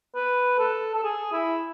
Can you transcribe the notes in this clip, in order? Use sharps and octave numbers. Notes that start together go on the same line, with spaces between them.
B4
A4
A4
G#4
E4